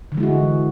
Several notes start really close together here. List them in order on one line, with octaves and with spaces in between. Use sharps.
D3 E3 G#3 E4 F#4